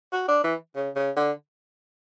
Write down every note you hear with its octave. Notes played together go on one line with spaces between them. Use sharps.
F#4
D4
E3
C#3
C#3
D3